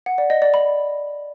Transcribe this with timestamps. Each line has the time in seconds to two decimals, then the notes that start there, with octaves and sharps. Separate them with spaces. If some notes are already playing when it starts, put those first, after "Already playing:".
0.06 F#5
0.18 D5
0.30 D#5
0.42 D5
0.54 B5